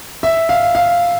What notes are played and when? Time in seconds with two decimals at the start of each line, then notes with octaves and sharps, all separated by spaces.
0.23 E5
0.49 F5
0.75 F5